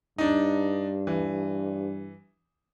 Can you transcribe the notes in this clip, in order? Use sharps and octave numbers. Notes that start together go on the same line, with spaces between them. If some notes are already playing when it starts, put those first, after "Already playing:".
G2 D4 D#4
E3